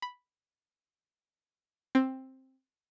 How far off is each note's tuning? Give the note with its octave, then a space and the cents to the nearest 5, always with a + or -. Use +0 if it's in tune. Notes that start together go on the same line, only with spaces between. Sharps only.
B5 +0
C4 +10